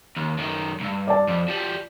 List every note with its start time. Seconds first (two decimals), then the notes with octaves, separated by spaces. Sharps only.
0.17 D#2
0.38 F#2 D#3
0.80 B1 G2
1.08 D5 A5
1.28 F2
1.48 F3 G3